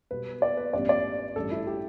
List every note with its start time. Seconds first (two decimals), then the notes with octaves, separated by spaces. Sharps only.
0.11 B1 B2 G3 B4
0.42 D5
0.57 B4
0.73 A1 G2 G3 B3 D5
0.89 D5
1.36 A1 G2 G3 A4
1.52 E4
1.67 G4